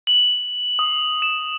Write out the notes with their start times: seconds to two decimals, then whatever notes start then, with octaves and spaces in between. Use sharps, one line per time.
0.07 F#7
0.79 D#6
1.22 E7